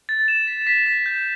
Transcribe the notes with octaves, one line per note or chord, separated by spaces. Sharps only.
A6
E7
B6
B6
B6
G6